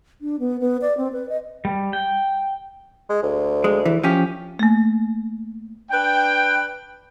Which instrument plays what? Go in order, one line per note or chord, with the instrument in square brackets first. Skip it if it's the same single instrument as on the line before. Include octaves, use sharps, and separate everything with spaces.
[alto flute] D4
B3
B3
D5
C4
B4
D#5
[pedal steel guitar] G3
G5
[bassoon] G#3
D2
[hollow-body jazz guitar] G#3
E3
F3 C#4 G4
[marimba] A3 A#3
[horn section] D4 B4 G5